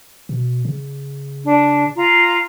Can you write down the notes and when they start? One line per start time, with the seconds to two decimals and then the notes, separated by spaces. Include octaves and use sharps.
0.29 B2
0.65 C#3
1.44 D4
1.95 F4 A#5